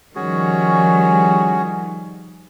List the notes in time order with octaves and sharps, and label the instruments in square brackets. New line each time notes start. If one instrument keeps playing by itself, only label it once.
[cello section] D#3 F3 G3 [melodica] C#4 F#4 G#4